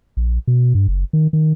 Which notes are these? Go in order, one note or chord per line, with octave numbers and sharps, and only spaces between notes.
A#1
B2
G2
F#1
D#3
D#3